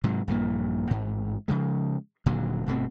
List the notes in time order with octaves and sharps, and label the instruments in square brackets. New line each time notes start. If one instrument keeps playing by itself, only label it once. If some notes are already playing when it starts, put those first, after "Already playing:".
[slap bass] G#2 C3 F#3
A#1 G2 E3 A#3
A1 G#2
C#3 F3 G#3
D#1 A#2 D3 F#3
G1 B2 A3 C4